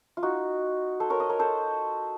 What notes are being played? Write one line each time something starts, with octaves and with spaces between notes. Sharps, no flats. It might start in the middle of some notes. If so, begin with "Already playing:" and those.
F4
D#4 F#4
A4 C5
A#4 C#5
C5 D#5
A#4 C#5
A4 C5